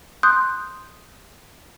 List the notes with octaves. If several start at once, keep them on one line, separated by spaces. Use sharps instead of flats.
C6 D#6 F#6 G6